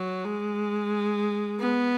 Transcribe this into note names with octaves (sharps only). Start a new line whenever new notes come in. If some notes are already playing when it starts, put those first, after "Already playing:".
Already playing: F#3
G#3
B3